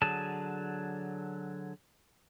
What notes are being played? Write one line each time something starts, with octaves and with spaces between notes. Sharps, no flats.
D3 F#3 G#4 A5